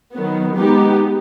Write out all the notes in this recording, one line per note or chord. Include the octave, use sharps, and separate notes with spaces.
D#3 F#3 B3
G#3 B3 D#4 G4